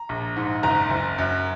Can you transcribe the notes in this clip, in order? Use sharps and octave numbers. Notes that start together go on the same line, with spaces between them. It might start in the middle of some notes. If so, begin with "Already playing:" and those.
Already playing: A#5
A#1
G#2
F#1 A#5
F#1
F#2